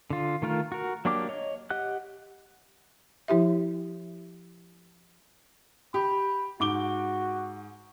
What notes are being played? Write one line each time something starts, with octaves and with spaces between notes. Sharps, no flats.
D3 F4
D#3 A3 F4 A#4
F#4 A#4
F#3 A#3 D4 G4 D6
C#5 D#5
G4 D#5 F#5 F#6
F3 E4 G4 E5
G4 B5
G#2 F#4 D6 G7